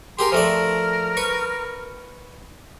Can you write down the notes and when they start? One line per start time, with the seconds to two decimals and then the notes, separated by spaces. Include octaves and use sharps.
0.19 G4 G#4 A#4 C6
0.32 F3 A3 A#4 D5
1.17 B4 C#6